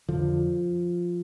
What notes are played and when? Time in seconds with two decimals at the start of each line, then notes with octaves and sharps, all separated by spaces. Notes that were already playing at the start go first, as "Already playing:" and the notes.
0.08 F2 D3 F3